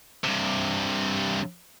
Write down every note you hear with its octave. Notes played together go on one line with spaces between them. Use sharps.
G2 C3